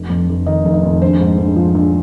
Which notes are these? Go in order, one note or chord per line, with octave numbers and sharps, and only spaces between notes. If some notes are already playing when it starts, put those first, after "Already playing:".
Already playing: F1
F2
F1
D#3 D#5
F1
D#5
F2
A#1 C5
G#2
A#1
F3
A#1